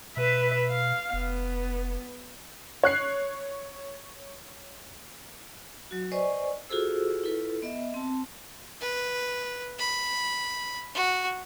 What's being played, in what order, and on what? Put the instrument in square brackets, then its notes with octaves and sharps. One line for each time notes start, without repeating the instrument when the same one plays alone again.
[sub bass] B2 [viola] B4 E5
[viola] F5
[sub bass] F1 [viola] B3
[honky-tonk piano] C#5 F#6 C7
[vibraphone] F#3 F#4
B4 C5 D5 D#5 G#5 C#6
F4 F#4 G#4 A4 C5 E6
E4 F4 A4 B4
B3 D#5 E5
C4 A5
[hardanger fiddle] B4
B5
F#4